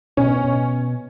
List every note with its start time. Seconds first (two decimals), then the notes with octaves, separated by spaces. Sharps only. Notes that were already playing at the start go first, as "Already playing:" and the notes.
0.17 B2 C#4
0.44 B2